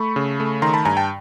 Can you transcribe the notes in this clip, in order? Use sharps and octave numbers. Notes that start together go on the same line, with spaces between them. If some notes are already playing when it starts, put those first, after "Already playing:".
Already playing: A3 B5 C#6
C#3
A3
D#3 A#5 C6
A5 B5
G2 G#5 A#5
G5 A5